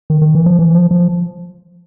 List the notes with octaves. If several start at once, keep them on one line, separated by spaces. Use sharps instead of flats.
D#3
D#3
E3
F3
E3
F3
F3